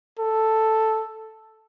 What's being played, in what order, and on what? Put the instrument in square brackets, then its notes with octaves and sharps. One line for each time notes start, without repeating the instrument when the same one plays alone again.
[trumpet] A4